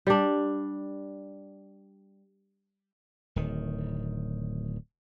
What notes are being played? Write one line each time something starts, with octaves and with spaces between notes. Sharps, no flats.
G3 D4
D1 D#3